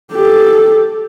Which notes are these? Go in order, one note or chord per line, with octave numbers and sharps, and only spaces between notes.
G4 A4